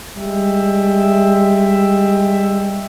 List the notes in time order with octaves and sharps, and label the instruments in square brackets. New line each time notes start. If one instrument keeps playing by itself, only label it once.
[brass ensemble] G3 G#3 E5 G5